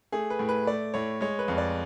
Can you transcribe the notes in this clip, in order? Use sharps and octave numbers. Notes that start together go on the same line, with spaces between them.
A3 G#4
B4
A2
B4
A3 D5
A2 C#5
G#3 C#5
B4
F2
D5